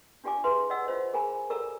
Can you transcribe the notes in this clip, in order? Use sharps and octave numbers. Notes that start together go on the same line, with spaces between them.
D4 F4 G4 D5 G#5 D6
E4 G#4 B4 E5 C6
D5 D#5 F#5 E6
F4 C5 D#5
G#4 A#4 G#5 A#5 B5
G4 A4 A#4 D5 A#5 E6